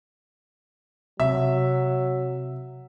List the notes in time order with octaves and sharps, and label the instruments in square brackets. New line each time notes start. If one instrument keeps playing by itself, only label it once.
[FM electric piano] C3 [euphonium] F#3 [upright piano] E5